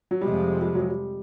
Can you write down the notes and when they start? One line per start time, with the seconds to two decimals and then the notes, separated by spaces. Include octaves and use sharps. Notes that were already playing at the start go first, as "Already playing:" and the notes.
0.11 F#3
0.21 F2 C3 F3 G3 G#3
0.61 G3
0.75 F#3
0.88 G3